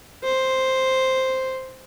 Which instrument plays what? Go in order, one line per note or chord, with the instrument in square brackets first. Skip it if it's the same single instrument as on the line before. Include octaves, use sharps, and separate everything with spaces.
[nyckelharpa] C5